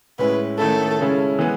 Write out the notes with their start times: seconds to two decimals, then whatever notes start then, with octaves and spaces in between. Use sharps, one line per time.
0.19 A2 G#3 C#4 E4 B4
0.59 D#3 A3 C#4 E4 A4
0.99 C#3 G#3 C#4 E4
1.39 E3 G#3 B3